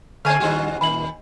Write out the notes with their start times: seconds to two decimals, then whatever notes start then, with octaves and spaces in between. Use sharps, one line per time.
0.25 D3 G#3 A3 C4 G#5 F6
0.40 D#1 D3 G3 F#4
0.81 D#1 D#3 B5 F#7